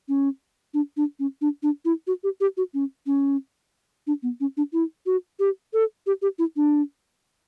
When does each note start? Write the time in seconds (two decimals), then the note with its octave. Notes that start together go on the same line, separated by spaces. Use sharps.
0.08 C#4
0.74 D4
0.97 D4
1.19 C#4
1.41 D4
1.63 D4
1.85 E4
2.07 F#4
2.23 G4
2.41 G4
2.57 F#4
2.74 C#4
3.06 C#4
4.07 D4
4.23 B3
4.40 C#4
4.57 D4
4.73 E4
5.06 F#4
5.39 G4
5.73 A4
6.07 G4
6.22 G4
6.39 E4
6.56 D4